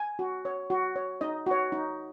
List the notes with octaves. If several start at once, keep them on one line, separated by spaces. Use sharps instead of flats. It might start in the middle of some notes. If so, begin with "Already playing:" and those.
Already playing: G#5
F#4
C#5
F#4
C#5
D#4 D#5
F#4 C#5
D#4